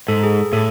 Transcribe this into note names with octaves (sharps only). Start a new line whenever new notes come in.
G#2 A4
G#4
A2 A4